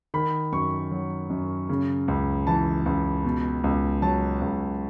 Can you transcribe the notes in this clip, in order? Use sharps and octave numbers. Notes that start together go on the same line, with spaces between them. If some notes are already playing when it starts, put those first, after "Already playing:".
D#3 B5
F#2 C#6
F#3
F#2
C#3
C#2
E3 A5
C#2
B2
C#2
F#3 A5
C#2